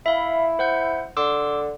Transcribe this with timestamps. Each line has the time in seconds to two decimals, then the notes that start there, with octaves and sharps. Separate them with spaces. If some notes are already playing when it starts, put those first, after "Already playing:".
0.06 E4 E5 F5 B5
0.59 C5 F#5 G6
1.17 D3 C6 D6 E6